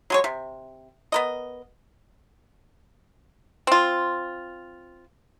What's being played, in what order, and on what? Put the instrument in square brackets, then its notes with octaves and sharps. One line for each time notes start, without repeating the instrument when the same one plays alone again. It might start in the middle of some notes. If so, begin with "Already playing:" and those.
[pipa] F#3 G#3 C#5
C3
B3 A#4 D#5
C4 F4